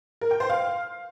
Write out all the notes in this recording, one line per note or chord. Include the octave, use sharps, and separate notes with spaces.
A#4
G5
C5
F5